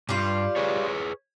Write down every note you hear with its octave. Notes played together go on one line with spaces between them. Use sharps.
G2 G3 F4
G#4 B4 C#5